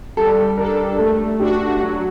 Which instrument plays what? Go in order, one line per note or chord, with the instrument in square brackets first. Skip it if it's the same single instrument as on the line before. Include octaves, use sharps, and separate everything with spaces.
[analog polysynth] G3 [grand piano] A4
[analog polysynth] D4 A4 [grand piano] A#4
[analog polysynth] A3 [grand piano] A4
[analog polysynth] D4 F#4 [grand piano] G4
[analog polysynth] F#3 [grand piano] F#4